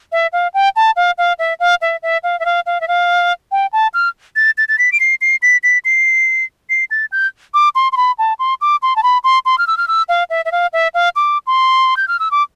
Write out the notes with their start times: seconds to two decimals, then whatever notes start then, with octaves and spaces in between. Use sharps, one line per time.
0.12 E5
0.33 F5
0.54 G5
0.76 A5
0.96 F5
1.18 F5
1.39 E5
1.60 F5
1.81 E5
2.03 E5
2.23 F5
2.39 E5
2.45 F5
2.66 F5
2.81 E5
2.88 F5
3.51 G5
3.73 A5
3.94 F6
4.36 A6
4.58 A6
4.68 A6
4.78 B6
4.92 D7
5.00 C7
5.21 C7
5.42 B6
5.63 B6
5.85 C7
6.70 C7
6.91 A6
7.12 G6
7.54 D6
7.75 C6
7.92 C6
7.97 B5
8.18 A5
8.39 C6
8.61 D6
8.82 C6
8.96 A5
9.03 B5
9.24 C6
9.45 C6
9.58 F6
9.67 E6
9.77 F6
9.88 E6
10.09 F5
10.30 E5
10.45 E5
10.52 F5
10.73 E5
10.94 F5
11.16 D6
11.47 C6
11.97 G6
12.08 F6
12.19 E6
12.31 D6